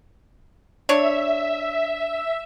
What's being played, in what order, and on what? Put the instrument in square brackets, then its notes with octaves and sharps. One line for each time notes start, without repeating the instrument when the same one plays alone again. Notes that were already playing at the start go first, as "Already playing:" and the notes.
[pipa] D4 C#5 [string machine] E5